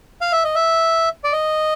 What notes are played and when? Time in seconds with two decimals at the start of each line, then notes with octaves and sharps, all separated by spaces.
0.21 F5
0.32 E5
0.44 D#5
0.55 E5
1.24 D5
1.33 D#5